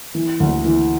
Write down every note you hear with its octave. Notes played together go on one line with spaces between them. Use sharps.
E3
D2
E3